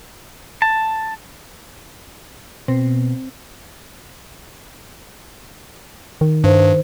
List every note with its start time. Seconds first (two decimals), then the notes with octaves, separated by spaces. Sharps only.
0.62 A5
2.68 B2 C4
6.21 D#3
6.44 G2 C5